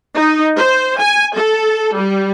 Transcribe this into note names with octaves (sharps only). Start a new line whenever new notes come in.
D#4
C5
G#5
A4
G3